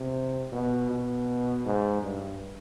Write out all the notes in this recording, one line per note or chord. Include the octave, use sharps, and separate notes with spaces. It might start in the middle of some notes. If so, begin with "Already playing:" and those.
Already playing: C3
B2
B2
G#2
G2